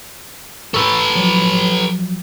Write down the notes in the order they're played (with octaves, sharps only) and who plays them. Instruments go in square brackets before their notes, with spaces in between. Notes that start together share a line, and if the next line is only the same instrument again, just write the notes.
[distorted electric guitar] A4 B4 [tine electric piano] C#6 E6
[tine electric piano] F3 F#3